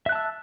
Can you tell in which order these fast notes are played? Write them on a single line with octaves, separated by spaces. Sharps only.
E5 F#6 A5 E6